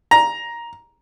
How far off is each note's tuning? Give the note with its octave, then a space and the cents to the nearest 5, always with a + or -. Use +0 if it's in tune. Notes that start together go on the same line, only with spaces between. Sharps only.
A#5 +10